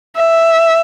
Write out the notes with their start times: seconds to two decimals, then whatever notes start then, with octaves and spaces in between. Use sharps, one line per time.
0.16 E5